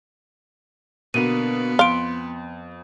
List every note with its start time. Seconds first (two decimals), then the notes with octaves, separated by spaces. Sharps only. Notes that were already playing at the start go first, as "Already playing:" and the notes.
1.14 B2 D3 A#3 B3 D#7
1.79 F2 F5 C6 D7